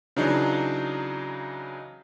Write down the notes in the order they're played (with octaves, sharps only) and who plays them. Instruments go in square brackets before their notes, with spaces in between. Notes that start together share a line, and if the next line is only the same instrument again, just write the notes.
[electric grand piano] C#3 E3 F#3 D4 D#4